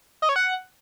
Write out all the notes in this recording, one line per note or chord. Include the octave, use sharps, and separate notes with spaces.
D#5
C#5
F#5